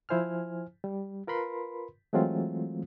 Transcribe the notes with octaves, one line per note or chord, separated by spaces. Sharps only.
F3 E4 C5 G#5 F6
G3
F4 A#4 B4 B5 C6
E3 F#3 G#3 A3 C4 F4